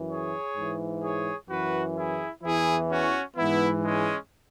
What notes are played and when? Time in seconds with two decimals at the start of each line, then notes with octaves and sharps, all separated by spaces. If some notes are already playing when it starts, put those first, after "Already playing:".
Already playing: F#2 E3
0.10 G#4 C#5
0.56 G#2 E3
1.03 G#4 C#5
1.49 F#2 E3 F#4 B4
1.97 E4 G#4
2.43 E2 E3 E4 G#4
2.90 C#4 F#4
3.37 G#2 E3 B3 E4
3.84 G#3 C#4